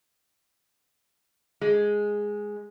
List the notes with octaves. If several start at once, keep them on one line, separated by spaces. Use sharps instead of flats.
G#3